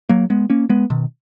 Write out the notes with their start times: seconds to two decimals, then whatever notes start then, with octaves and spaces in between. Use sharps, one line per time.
0.09 F#3 A#3
0.30 G#3 B3
0.50 A#3 C#4
0.69 G#3 B3
0.90 B2 D#3